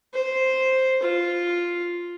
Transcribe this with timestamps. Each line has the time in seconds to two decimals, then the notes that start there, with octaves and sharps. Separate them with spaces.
0.14 C5
1.03 F4